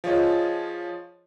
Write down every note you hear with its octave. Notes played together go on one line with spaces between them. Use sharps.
F3 F4 G#4 C#5 D#5